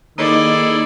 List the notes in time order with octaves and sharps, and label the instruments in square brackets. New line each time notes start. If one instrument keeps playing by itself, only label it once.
[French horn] D#3 [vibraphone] A#3 D#4 D#5 [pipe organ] E4 G#4 A4 [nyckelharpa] D5